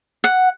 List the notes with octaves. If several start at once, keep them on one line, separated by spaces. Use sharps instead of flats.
F#5